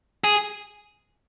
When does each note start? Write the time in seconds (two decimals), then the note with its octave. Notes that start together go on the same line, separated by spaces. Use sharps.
0.24 G#4